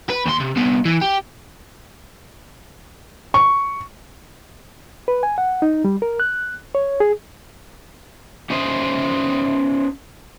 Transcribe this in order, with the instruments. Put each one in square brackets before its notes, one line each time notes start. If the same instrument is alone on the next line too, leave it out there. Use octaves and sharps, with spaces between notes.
[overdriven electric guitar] B4
D#2 C6
C3
C2 B3
E3
G4
[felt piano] C#6
[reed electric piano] B4
G#5
F#5
D#4
G3
A#4
F#6
C#5
G#4
[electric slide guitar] C#4 D#4 C5 D#5 E5